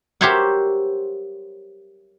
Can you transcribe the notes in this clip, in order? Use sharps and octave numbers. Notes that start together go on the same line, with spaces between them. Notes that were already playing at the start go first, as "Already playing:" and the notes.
G4 A#4 C5 C#5 E5 F#5